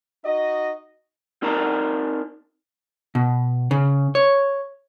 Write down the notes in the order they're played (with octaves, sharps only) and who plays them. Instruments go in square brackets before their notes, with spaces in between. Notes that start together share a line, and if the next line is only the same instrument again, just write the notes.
[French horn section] D#4 F#4 D#5
[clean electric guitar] C4 D#4 A#4 D5 A5 A#5
[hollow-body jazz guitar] B2
C#3
C#5